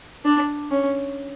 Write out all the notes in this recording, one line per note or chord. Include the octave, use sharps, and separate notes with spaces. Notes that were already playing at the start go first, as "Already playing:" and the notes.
D4
C#4